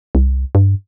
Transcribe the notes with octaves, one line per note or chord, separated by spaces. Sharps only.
C2
G2